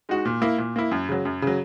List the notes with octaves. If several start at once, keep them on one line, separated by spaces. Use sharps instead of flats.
G#3 D#4 F#4
A#2
A#3 E4
A#2
A#3 E4
F#2
C#3 F#3
F#2
C#3 F#3